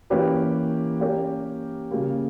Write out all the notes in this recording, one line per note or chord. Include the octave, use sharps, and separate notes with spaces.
E3 A#3 C#4 G4 B4
A#3 C#4 G4 A#4
C#3 G3 A#3